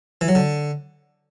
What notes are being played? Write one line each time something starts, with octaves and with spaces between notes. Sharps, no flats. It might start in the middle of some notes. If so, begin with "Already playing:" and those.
E3
F#3
D3